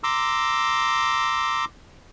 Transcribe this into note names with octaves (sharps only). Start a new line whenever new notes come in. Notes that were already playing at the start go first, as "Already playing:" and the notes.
A#5 C6 D6 E6